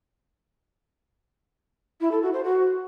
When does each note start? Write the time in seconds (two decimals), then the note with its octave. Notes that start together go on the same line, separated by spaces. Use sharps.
2.01 E4
2.11 A4
2.22 F#4
2.33 C5
2.44 F#4